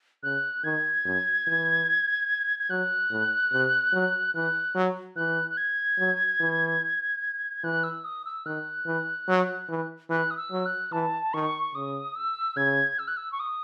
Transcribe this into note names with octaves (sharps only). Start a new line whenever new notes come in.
C#3 F#6
D#3 G#6
F#2
E3
G#6
F#3 F#6
A2
C3
F#3
E3 F#6
F#3
E3 F#6
F#6
G#6
F#3
E3
E3 F#6
E6
D#6
E6
D#3 F#6
E3
F#3
E3
E3 F#6
D#6
E6
F#3
F#6
E3 A5
D#3 C#6
C#3 D#6
E6
C#3 G#6
E6
F#6
E6
C#6
D#6